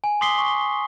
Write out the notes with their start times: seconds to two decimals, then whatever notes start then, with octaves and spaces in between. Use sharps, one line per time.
0.04 G#5
0.21 C6 D6 D#6 B6 C7 G7
0.38 C#6